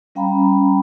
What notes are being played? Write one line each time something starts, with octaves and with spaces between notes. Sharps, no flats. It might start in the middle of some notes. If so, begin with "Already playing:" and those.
G3 C#4 F5 G5 A#5 B5